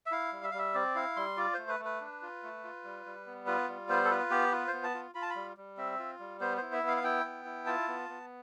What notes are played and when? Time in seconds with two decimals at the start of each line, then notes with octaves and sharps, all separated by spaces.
0.06 E5
0.12 E4 F5
0.32 G3
0.43 E5
0.51 G3 F5
0.59 E5
0.75 C4 D5
0.95 E4 F5
1.16 G3 C6
1.37 F4 D5
1.54 A3 C5
1.68 B4
1.79 A3
1.85 B4
2.01 D4
2.22 F4
2.43 A3
2.64 F4
2.84 G3
3.06 G3
3.26 B3
3.47 F4 B4
3.68 G3
3.89 B3 C5
4.05 A4
4.11 F4 B4
4.31 B3 G4
4.52 F4 B4
4.68 C5
4.73 B3
4.84 A5
4.94 F4
5.15 F4 B5
5.22 A5
5.30 B5
5.36 G3
5.57 G3
5.77 C4 E5
5.99 F4
6.19 G3
6.41 B3 C5
6.57 E4 C5
6.73 E5
6.83 B3 F5
6.96 F5
7.04 E4 G5
7.24 B3
7.45 E4
7.66 F4 A5
7.88 B3
8.09 B3